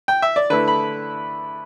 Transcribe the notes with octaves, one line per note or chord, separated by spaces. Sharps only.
G5
E5
D5
D3 A3 E4 B4
B5